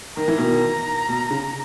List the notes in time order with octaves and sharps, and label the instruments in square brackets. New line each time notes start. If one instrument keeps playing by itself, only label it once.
[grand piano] D#3 [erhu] A#5
[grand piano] E3
B2 D#3
B2
C#3